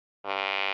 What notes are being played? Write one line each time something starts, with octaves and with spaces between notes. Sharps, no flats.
G2